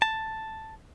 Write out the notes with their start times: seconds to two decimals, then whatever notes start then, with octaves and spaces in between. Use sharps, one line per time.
0.02 A5